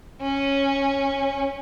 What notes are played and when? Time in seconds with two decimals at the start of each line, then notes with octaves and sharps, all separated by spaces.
0.21 C#4